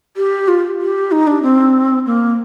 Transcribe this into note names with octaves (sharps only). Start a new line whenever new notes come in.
G4
F4
G4
D#4
D4
C4
A#3